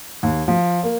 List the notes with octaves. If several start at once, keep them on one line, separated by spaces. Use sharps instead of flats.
D#2
F3
A#3